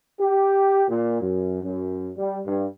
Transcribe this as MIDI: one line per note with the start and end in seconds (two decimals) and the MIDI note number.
0.19 0.83 67
0.88 1.18 46
1.21 1.60 42
1.62 2.09 42
2.16 2.38 55
2.46 2.65 43